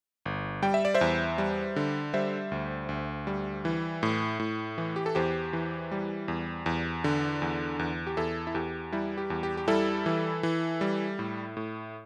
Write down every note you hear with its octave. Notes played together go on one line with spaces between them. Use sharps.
G1
G3 G5
E5
D5
C5 E5
E2
G3
D3
G3 C5 E5
D2
D2
G3
E3
A2
A2
E3
G4
A4
E2 G4 C5
E3
G3
E2
E2
D3
E2
E2
G4
E2 E4 A4
E4
E2 G4
G3 E4
G4
E2
G4
G4
G3 E4 A4
E3
E3
G3
A2
A2